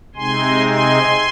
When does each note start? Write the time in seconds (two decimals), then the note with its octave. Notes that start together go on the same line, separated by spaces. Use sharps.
0.15 C3 G#3 C4 D#4 G#5 C6
0.67 G#5 C6